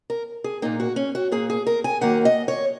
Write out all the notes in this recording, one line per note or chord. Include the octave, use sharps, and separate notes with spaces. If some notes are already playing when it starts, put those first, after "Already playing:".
A#4
G#4
A#2 A#3 D#4
F#4
C#4
F#4
A#2 A#3 G#4
G#4
A#4
G#5
D#2 D#3 F#3 A#3 F#5
D#5
C#5